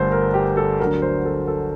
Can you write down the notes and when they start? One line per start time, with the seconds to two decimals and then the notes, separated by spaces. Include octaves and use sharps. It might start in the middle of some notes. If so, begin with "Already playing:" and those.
Already playing: G1 G2 A3 A#4 C5
0.12 A#4
0.34 G4
0.57 A4
0.80 D2 D3 F#3 A#4
1.02 C5
1.25 A4
1.48 A4